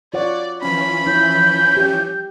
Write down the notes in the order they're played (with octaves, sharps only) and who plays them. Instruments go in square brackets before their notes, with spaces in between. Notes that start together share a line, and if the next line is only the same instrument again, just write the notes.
[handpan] F4 C#5 F#5 [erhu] D5
[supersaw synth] E3 F3 C#4 [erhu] B5
[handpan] E4 [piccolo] G6
[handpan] G4